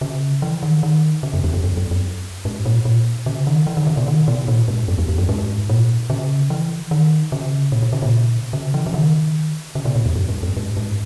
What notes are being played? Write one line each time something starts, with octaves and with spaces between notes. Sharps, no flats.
C#3
E3
D#3
D#3
C#3
F#2
E2
F#2
F#2
F#2
F#2
G#2
A#2
A#2
C#3
D#3
E3
D#3
C#3
B2
D#3
B2
A#2
G#2
F#2
E2
E2
F#2
G#2
A#2
C#3
E3
D#3
C#3
A#2
A#2
C#3
A#2
C#3
E3
C#3
D#3
C#3
B2
A#2
E2
F#2
G#2
F#2
G#2
G#2